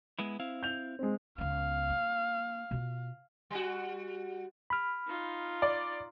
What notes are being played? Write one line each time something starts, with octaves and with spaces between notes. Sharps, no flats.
G#3 B3 E4
C4 E4 F5
G6 F7
G#3 C4
C#2 B3 F5
A#3
B2 F4
G3 F#4
B5 F6
D#4 F4
D5